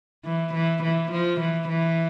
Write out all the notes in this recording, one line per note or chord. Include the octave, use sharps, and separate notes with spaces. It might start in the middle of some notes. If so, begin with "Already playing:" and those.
E3
E3
E3
F3
E3
E3